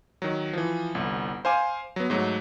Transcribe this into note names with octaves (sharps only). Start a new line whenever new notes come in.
D#3 F#3
E3 F3
G1 C2
C5 F5 G#5 D6
F#3 B3
G#2 F#3 A3